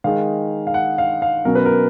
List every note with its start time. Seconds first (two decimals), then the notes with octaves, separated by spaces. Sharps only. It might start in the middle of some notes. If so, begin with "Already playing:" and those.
0.04 D#3 G#3 D#4 F5
0.67 F5
0.74 F#5
0.98 F5
1.22 F5
1.45 B2 F#3 C#4 A#4
1.55 B4
1.66 A#4